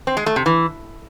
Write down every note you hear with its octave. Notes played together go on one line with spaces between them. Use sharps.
C4
G#3
A3
C3
E3